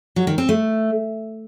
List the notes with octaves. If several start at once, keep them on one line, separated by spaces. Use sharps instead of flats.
F#3
D#3
C4
A3